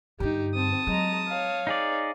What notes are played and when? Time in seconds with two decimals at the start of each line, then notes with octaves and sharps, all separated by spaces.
0.20 G2 D3 D#4 G4
0.55 C4 A5 D#6
0.87 F#3 G#3 A#5
1.28 C#5 F5
1.67 D#4 G#4 D5